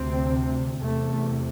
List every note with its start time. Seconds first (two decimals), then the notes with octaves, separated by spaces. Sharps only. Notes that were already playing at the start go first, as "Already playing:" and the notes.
Already playing: D2 C3 C4
0.82 E2 C3 A3